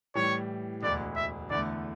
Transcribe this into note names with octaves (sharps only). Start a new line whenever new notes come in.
A2 E3 G3 C#5
E1 D2 D3 D5
E5
E2 D3 A3 D5